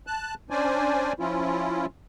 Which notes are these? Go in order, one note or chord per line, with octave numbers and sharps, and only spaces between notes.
A5 F#6
C#4 D4 C5 D5 G#5
F3 C#4 E4 F4